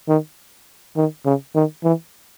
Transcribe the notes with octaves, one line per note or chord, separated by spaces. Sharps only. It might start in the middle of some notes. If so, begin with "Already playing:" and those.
D#3
D#3
C#3
D#3
E3